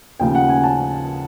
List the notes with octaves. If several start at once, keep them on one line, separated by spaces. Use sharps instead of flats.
D#2 C#3 F3 G5
F#5
G#5
A5